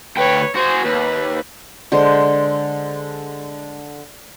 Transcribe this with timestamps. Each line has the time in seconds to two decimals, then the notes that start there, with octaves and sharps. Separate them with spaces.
0.17 D2 B4 C#5 G5
0.55 F#4 G#4 C5
0.84 D#2 B4
1.92 D3 G#3 C5